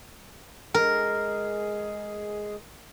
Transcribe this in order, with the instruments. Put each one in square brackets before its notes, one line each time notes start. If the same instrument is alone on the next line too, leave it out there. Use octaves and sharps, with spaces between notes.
[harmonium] G#3 G#4 [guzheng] A#4